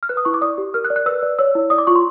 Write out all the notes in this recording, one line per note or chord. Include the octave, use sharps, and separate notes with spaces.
F6
B4 F#6
D#6
E4 C#6
D6
D5 D#6
G4
A#4 F6
F#6
D5
F#6
B4 E6
D5
C#5 E6
E4
D5 D#6
D6
F4 C#6
C6